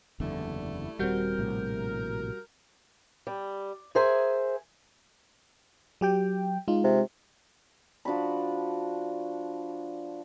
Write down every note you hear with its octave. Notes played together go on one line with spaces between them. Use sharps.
F#1 E2 D3 G3 A3 E4
D#1 G3 C4 F#4 A#4 G6
A#1 A2 C3
G3
G#4 A#4 C5 E5 G#5
F#3 G4 G5
G#3 D#4 F4
C3
F3 D4 F#4 B5